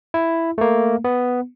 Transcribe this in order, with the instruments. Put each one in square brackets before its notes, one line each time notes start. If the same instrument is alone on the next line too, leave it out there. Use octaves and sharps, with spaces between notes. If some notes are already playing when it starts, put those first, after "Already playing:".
[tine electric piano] E4
A3 A#3
B3